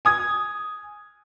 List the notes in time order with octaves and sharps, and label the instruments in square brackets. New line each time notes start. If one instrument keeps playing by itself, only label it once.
[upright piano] G#5 D#6 G#6